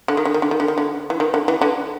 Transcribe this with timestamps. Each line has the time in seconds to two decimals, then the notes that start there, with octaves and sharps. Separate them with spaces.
0.08 D3
0.17 D#3
0.25 D3
0.34 D#3
0.42 D3
0.51 D#3
0.60 D3
0.68 D#3
0.78 D3
1.10 E3
1.20 D#3
1.34 D3
1.48 E3
1.61 D3